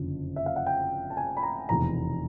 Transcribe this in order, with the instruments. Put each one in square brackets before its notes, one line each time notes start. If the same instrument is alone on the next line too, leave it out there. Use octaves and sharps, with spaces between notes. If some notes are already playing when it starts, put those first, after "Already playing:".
Already playing: [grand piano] F#1 F2 D3
E5
F5
F#5
G5
A5
G#5
B5
A#5
F1 E2 B2 A#5